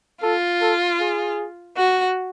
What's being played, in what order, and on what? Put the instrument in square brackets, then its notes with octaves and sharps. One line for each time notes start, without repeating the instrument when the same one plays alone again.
[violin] F4 [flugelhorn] A4
[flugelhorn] A4
G#4
[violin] F#4